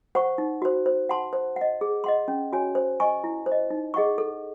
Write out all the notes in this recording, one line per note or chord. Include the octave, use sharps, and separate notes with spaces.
C5 F#5 C#6
D#4
F#4 C5
C5
F#5 A5 C6
C5
D#5 F#5
G#4
D#5 F#5 C6
C#4
F#4 C#5 G#5
C5
D#5 G#5 C#6
E4
C5
D#5
D#4
G#4 D#5 F#5 C#6
A4